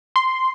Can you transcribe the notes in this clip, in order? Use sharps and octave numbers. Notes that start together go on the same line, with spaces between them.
C6